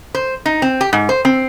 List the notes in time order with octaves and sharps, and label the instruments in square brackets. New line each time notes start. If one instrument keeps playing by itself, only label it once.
[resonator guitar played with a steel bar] C5
D#4
C4
G4
G#2
C5
C4